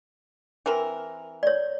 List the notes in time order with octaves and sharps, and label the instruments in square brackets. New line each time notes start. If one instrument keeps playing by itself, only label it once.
[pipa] E3 C4 A#4
[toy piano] C#5 D5